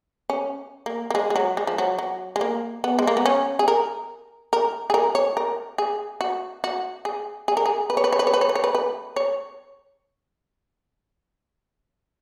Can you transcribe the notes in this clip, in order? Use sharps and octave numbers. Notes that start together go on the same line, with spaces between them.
C#4
A#3
A#3
G#3
G#3
F#3
G#3
F3
F#3
F#3
G#3
A#3
B3
G#3
A#3
B3
C#4
G#4
A#4
A#4
G#4
A#4
C#5
A#4
G#4
F#4
F#4
G#4
G#4
A#4
G#4
B4
C#5
B4
C#5
B4
C#5
B4
C#5
B4
C#5
B4
B4
C#5